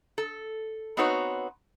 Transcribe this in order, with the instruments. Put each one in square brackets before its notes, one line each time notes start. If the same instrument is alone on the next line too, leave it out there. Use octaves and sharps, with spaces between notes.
[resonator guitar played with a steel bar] A4
B3 C4 D#4 F#4 B4 C#5